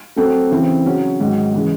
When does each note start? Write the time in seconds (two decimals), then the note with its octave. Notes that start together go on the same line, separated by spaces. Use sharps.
0.16 F#3 A3 C4 F#4 A4
0.50 C#3 E3 C4 E4
0.86 C#3 F#3 C#4
1.20 G#2 D#3 F#3
1.54 C#3 E3 G#3